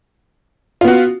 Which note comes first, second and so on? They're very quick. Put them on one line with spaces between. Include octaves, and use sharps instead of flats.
F4 B3 F#4